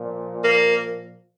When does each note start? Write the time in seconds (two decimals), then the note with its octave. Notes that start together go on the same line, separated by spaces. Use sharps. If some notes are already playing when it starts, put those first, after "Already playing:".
Already playing: A#2 F3
0.44 A#3